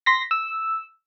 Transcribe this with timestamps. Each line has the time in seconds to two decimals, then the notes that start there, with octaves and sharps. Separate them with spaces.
0.06 C6 A#6 B6
0.31 E6